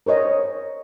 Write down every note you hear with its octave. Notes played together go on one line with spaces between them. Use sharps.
A#4 C5 C#5 D#5